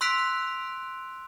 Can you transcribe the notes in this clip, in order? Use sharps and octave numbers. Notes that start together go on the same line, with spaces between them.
C6 E6 F#6 B6 D7 F7